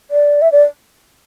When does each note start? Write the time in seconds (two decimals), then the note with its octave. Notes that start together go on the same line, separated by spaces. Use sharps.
0.11 D5
0.42 E5
0.52 D5